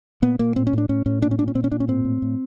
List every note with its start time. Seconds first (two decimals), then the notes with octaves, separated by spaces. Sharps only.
0.22 A#2 B3
0.39 A#2 A#3
0.56 A2 C4
0.67 C#4
0.73 A2 D4
0.89 A2 C#4
1.06 A2 C#4
1.22 A#2 D4
1.31 C#4
1.38 A#2 D4
1.48 C#4
1.55 A#2 C4
1.64 C#4
1.72 A#2 D4
1.80 C#4
1.88 A2 C4
2.05 A2
2.22 A2